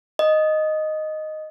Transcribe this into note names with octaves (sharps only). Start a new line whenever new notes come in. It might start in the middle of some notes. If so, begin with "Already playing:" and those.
D#5